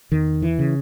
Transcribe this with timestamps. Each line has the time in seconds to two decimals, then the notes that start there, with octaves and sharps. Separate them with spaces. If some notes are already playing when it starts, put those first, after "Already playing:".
0.12 E2 D#3
0.42 E3
0.59 C#3